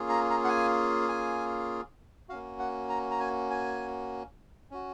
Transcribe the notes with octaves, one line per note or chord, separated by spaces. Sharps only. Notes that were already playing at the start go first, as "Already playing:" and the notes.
Already playing: A#3 C#4 F4 G#4
A#5
A#5
F#5
G#5
G#5
A#3 C#4 F#4 F5
F#5
A#5
A#5
G#5
G#5
C#4 F#4